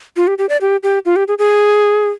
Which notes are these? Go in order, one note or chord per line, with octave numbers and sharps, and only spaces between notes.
F4
G4
G4
D5
G4
G4
F4
G4
G#4
G#4